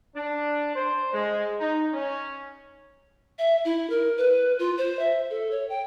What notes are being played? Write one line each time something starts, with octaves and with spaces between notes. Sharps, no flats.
D4
C5
G#3
D#4
C#4
E5
E4
A#4
B4
F4
C5
E5
A4
C#5
G5